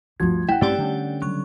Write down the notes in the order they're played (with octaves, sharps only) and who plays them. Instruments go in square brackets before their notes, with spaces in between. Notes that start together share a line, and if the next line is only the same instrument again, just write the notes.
[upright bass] D2 G2 [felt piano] F3 F#4 [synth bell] G#6
[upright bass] A#1 [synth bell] E4 [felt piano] F#5 G5
[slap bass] G2 C4 C#4 [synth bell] A3 G4 D5
[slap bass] D3 C#4 [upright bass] G3
[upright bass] C#3 G3 [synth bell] F#3 C#6